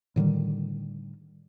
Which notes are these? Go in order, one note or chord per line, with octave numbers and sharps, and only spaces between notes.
A2 D3 D#3 G3